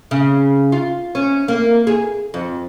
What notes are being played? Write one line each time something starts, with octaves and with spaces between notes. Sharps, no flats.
C#3
F4
C#4
A#3
G#4
F2